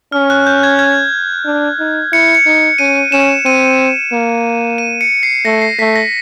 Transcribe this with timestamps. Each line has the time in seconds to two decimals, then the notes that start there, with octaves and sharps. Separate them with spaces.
0.12 C#4 F6
0.30 F#6
0.47 G6
0.63 G#6
0.79 G#6
1.45 D4
1.79 D#4
2.12 E4 C#7
2.35 C#7
2.46 D#4
2.78 C#4 D#7
3.12 C#4 E7
3.45 C4 D#7
4.12 A#3
4.78 D#7
5.01 C#7
5.23 C7
5.45 A3 A#6
5.62 C7
5.79 A3 B6
5.96 A#6